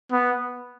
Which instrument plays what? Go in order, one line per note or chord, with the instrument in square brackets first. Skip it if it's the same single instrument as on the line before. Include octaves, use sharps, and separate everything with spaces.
[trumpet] B3